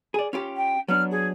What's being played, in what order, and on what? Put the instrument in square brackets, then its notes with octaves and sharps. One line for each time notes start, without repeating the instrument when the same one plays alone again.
[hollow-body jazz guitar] G#4 D5
C#4 F4 G4
[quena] G5
[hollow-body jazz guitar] F#3 B3 D4 [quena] F6
[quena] G#4